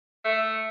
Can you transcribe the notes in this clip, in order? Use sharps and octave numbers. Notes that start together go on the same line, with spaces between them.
A3